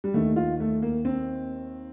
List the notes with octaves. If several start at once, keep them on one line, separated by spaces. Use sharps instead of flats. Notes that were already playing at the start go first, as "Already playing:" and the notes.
G3
D#2 D#3 A3
F4
A3
A#3
C4